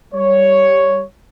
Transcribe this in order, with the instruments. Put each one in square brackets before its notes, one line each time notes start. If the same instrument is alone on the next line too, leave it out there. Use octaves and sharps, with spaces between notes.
[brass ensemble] G3 C#5